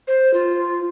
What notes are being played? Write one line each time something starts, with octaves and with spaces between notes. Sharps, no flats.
C5
F4